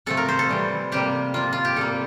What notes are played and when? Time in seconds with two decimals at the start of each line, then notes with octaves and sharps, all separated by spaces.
0.06 C3 F3 A3 A4
0.17 A#4
0.29 C5
0.39 A4
0.49 C3 E3 G3
0.92 C3 G3 A#3 G4
1.34 C3 F3 A#3 F4
1.53 F4
1.65 G4
1.76 C3 G3 A#3 A4